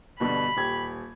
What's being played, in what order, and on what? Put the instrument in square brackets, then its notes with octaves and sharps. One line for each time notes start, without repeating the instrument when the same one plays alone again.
[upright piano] G2 B2 D3 [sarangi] B5
[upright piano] D#1 G4 G#6